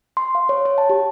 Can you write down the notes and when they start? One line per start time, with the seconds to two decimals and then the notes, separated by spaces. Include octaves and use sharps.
0.17 C6
0.35 F5
0.49 C#5
0.65 C#5
0.78 A5
0.90 G4